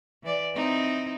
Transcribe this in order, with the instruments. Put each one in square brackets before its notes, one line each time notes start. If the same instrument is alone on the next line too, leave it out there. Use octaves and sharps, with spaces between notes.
[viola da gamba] E3 D5
C4 D#4 E4